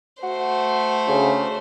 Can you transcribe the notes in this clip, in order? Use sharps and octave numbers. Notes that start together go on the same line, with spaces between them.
A3 F#4 C5
D2 C#3